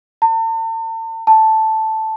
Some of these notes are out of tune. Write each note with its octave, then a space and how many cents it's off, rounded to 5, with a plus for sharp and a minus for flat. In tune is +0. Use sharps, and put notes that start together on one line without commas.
A5 +40
A5 +0